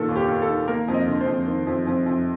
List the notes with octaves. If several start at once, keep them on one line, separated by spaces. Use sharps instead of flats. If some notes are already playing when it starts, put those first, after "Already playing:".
Already playing: A#2 D#3 A4
D#2
G4
D#2
A4
D#3
A#3 A#4
F2
D#5
D3
C5
F2
D#3
F2
F2
F2